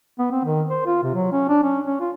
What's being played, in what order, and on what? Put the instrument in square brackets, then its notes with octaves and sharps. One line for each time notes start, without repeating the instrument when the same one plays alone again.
[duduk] B3
C4
D#3
C5
F4
C3
F#3
C#4
D4
C#4
C#4
F4